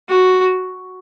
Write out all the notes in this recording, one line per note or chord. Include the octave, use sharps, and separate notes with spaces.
F#4